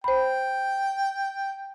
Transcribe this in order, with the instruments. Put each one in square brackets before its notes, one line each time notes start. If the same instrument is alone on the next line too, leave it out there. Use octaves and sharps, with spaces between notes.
[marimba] C5 B5 [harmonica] G5